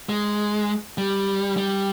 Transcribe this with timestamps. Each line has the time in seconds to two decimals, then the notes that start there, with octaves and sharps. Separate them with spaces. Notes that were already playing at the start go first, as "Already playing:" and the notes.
0.09 G#3
0.98 G3
1.57 G3